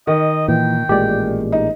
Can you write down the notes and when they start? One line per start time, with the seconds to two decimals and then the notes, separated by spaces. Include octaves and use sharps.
0.07 D#3 D#5
0.48 A#2 E3 G5
0.89 A1 A#2 G#3 G4 D5
1.52 D#4